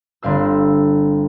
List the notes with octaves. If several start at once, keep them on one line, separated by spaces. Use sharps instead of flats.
G1 D3 C4 F5 E6